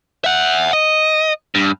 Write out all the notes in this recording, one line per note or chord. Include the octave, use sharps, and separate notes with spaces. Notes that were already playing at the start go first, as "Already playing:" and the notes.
E5 F#5
D#5
G2